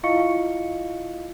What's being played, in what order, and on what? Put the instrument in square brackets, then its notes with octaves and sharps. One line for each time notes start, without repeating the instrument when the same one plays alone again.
[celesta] E4 F4 D#5 F5 C#6 C#7